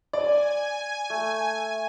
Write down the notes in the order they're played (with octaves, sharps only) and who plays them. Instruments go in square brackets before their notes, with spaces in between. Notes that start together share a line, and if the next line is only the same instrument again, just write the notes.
[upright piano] D5 [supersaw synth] G#5
[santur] A3